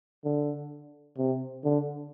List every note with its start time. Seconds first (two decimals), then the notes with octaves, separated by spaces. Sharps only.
0.25 D3
1.18 C3
1.64 D3